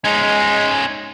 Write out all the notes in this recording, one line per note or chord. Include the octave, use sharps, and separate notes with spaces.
G#3 C#4 D#4